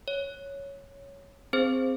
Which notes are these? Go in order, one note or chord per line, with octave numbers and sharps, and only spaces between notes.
C#5
C4 G#4 C5